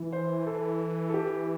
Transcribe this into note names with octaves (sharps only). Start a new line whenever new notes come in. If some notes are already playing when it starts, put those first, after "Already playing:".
Already playing: E3
C5
A4
A4
G4